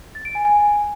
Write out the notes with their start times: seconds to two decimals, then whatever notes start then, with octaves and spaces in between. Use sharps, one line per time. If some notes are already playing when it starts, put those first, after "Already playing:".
0.15 A6
0.25 D7
0.35 G#5
0.45 G#5